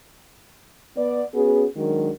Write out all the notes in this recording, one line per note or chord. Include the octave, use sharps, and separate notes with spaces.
B3 D5
B3 C#4 F#4 G#4
D#3 F#3 G#3 D4 F#4 A#4